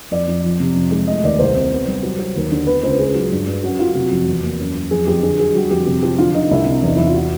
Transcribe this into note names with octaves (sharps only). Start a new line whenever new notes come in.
F2 D5
F2
F3
C3
F2
G#3
A3 D#5
D#2 D5
C2 C5
C3
B3
G3
F#3
F#3
D#2
D3
B3 B4
C#2 C5
C#2 G#4
F#3
G2
G2
F#2 F#4
F#3 F4
C3 F#4
F2
E2
A#3
F#2
F#2
F2 G#4
F2 G4
D3 G#4
F#3 G#4
G3 F#4
F2 G4
C3 G4
F3 G4
D3 F4
D3 D#4
C2 E4
C3
E2
D#4
E2 E4
F4
F#4